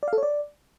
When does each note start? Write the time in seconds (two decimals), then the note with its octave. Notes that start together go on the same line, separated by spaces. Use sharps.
0.03 D5
0.08 F5
0.13 A4
0.18 C#5
0.23 D5